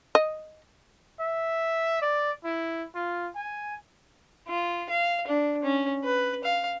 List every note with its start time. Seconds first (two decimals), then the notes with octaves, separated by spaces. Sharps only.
0.15 D#5
1.20 E5
2.02 D5
2.44 E4
2.95 F4
3.36 G#5
4.48 F4
4.89 F5
5.27 D4
5.63 C#4
6.04 B4
6.44 F5